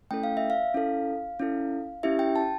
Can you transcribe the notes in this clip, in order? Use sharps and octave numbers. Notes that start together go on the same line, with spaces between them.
A3 C#4 E4 A4 G5
F5
E5
F5
C#4 E4 A4
C#4 E4 A4
C#4 E4 G4 E5
G5
A5